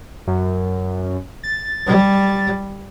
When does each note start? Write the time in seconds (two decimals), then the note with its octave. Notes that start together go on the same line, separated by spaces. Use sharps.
0.27 F#2
1.44 A6
1.86 G3